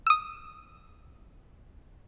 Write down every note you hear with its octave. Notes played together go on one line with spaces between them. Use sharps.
D#6 E6